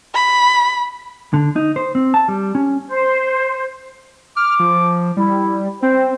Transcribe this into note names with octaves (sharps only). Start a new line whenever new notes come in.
B5
D3
D#4
C5
C4
A5
G3
C#4
C5
D6 F6
F3
G3 E4
C4 C5